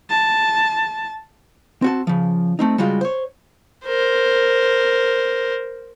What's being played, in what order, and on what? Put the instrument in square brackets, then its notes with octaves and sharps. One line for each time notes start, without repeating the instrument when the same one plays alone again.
[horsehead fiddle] A5
[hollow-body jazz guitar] C4 F#4 A5
C#3 F3
A3 C4 D#4
C#3 G3 G#3 F4 F#4
C5 C#5
[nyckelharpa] A#4 C5